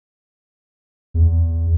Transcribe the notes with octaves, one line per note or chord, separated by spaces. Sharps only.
E2